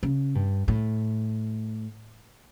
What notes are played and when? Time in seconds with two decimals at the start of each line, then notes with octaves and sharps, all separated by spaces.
0.03 C#3
0.35 G2
0.68 A2